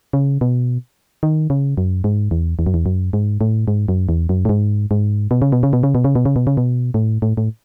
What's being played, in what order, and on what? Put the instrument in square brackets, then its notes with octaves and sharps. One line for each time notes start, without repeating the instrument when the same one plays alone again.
[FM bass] C#3
B2
D#3
C#3
F#2
G#2
E2
E2
F#2
E2
F#2
G#2
A2
G#2
F#2
E2
F#2
A2
G#2
G#2
B2
C#3
B2
C#3
B2
C#3
B2
C#3
B2
C#3
B2
C#3
B2
A2
A2
A2